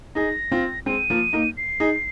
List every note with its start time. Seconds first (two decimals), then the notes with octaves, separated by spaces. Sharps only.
0.15 D#4 G#4 A#6
0.52 C4 F4
0.86 G#3 C4 D#7
1.10 F3 A#3
1.33 A#3 D#4
1.57 C7
1.80 D#4 G#4